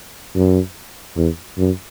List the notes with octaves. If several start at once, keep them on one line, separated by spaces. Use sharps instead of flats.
F#2
E2
F#2